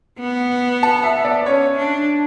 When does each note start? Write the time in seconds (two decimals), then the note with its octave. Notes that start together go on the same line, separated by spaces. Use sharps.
0.20 B3
0.83 A5
1.03 E5
1.24 D5
1.45 C#4 C#5
1.77 D4